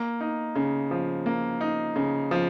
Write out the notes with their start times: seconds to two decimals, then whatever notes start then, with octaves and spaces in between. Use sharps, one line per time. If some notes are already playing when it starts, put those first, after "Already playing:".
Already playing: A#3
0.21 D#4
0.55 C#3
0.91 F3
1.26 A#3
1.61 D#4
1.96 C#3
2.31 F3